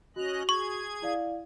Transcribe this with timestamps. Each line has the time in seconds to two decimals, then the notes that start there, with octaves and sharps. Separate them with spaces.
0.16 C#4 F#4 D#5 F#6 F7
0.49 G#4 C#6 G#6
1.02 E4 D5 F5